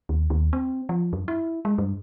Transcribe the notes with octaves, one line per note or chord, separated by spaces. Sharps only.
D#2
D#2
C4
F3
F#2
E4
G#3
G2